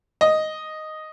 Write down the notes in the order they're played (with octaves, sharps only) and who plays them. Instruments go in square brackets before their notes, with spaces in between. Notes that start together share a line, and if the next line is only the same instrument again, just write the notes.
[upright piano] D#5